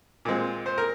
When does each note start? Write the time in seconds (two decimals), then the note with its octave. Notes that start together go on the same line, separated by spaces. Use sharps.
0.25 A#2 G#3 C4
0.66 C5
0.78 A#4